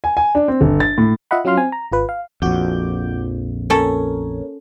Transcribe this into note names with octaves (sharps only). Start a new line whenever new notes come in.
G#5
G#5
D4
C4
G1
A6
A2
F4 D#5 E5 F#5 B5
F#3 C#4 F4 F5 C6 F6
C4 G#5
A#5
G#1 F4 B4
F5
A#1 F2 F#4 D6 G6
A#3 C#4 A4 A#4 C#5